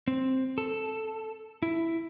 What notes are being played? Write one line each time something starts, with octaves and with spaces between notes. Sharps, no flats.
C4
A4
E4